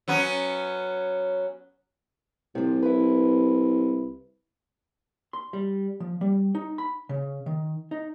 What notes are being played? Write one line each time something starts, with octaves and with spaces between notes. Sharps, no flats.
F#3 B3 C#4
C2 C3 F3
E4 B4
C6
G3
F3
G3
D#4
B5
C#3
D#3
D#4